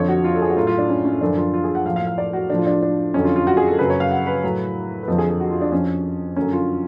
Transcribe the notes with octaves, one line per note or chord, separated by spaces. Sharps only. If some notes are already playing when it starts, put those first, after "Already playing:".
Already playing: F2 D3 F3 C#5
F#4
F4
A4
G#4
F#4
A2 F#3 F4
F4
D4
C#4
C#4
F#2 D3 F3 D4
F4
F4
G#4
F#5
A2 F3 F5
F5
F5
D5
F#4
A2 F3 D4
F4
D4
D4
F2 D3 F#3 C#4
F4
F4
F#4
G#4
A4
F#2 C#3 F#3 B4
C#5
F5
F#5
B4
A2 F#3
B4
F2 D3 F3 A4
G#4
G#4
F#4
F4
D4
F2 F3 C#4
F#2 D3 F#3 C#4
F4